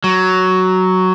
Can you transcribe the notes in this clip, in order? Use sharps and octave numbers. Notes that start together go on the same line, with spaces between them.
F#3